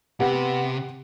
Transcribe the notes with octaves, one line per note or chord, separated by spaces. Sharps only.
C3 B3 G4 F#5